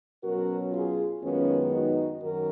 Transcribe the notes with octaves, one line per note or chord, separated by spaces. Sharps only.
B2 F#3 C#4 F#4 A#4
F4 G#4
F#2 D#3 G#3 B3 C#4 F4
D#4 F#4
F#2 D#3 F#4 A#4